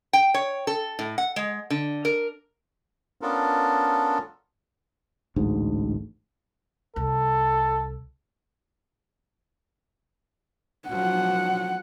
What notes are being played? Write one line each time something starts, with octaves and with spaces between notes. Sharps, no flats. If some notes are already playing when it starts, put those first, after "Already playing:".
G5
C#5
A4
A2
F#5
G#3
D3
A#4
B3 C#4 D4 F4 A4 A#4
A1 D2 G#2
C2 A4
F3 F#3 F#5